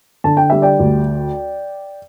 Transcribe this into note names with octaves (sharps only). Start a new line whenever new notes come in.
D3 A5
G5
G3 E5
D5 G5
D2